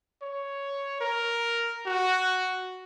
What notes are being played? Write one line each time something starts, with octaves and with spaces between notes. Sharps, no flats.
C#5
A#4
F#4